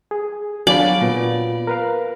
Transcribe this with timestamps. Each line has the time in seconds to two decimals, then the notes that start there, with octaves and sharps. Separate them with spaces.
0.11 G#4
0.67 F#3 D4 C#5 D5 F5 G#5 B5
1.02 A#2 B3 F4
1.67 A#4 B4 F5